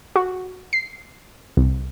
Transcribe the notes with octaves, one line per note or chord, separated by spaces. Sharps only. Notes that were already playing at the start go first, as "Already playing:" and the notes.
F#4
C7
C2